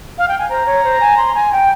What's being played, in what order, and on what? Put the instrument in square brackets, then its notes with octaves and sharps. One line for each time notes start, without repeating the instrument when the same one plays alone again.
[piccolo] F5
G5
G#5
[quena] C5 [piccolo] A#5
[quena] C#5
C5
G#5
C6
G#5
G5